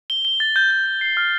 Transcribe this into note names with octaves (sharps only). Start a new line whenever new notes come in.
G7
G7
A6
G6
G6
G6
C7
F6